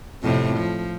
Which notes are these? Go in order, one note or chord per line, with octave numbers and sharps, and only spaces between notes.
F2 A2 C3
F3